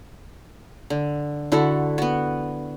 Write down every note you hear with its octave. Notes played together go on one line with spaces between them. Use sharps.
D3
D3 E4 F#4 A4
B3 F#4